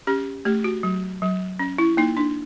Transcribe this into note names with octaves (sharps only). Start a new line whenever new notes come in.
C#4 G4
A3 G4
F#4
F#3
F#3
C#4
E4
A#3 D#4
D4